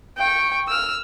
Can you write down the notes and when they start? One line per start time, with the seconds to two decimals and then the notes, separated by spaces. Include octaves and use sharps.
0.18 G5 C#6
0.68 E6 F6